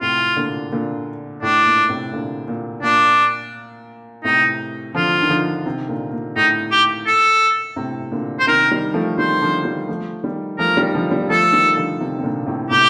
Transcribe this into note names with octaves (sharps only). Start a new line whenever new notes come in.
A2 C3 F4
A#2 D3
A#2 D3
A2 D4
A#2
A2 C3
A#2 D3
A#2
A#2 D4
A2 C3 D#4
D3 F3 F4
D#3
D3 F3
C3 D#3
A#2 D3
A#2
A2 D#4
G4
A4
A2 C3
A#2 D3
C5
C3 D#3 A#4
D#3 G3
F3 A3
D#3 G3 C5
D3 F3
D#3 G3
F3 A3
D#3 G3
F3 A3 A#4
D#3 G3
D3 F3
D#3 G3
F3 A3 A4
D#3 G3
D3 F3
C3 D#3
C3
A#2 D3
A2 C3
A2 C3 G4